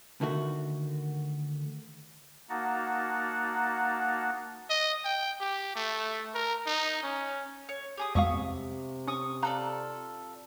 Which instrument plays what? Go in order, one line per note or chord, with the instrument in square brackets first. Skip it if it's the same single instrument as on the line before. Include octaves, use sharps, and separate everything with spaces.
[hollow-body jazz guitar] D3 D#3 A3 F#4
[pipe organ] A#3 D#4 F#4 F#5 A5 A#5
[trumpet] D#5
G5
G4
A3
A#4
D#4
C#4
[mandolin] C#5
G4 G#4 D#6
[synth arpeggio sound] F2 G#3 F5 [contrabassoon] B2 [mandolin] E5 C#6 D#6
[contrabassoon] C3
[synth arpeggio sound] C#4 [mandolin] C#6 D#6
[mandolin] F4 A4 D5 [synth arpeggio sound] F5 A#5 F#6